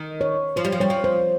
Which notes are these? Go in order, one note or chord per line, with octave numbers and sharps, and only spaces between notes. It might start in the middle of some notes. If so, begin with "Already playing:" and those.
Already playing: D#3
C#5
F3 C5
G3
F3
G3 C#5
F3
C5